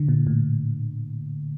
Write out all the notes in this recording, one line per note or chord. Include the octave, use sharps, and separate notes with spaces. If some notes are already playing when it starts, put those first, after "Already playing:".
Already playing: D3
A#2
A2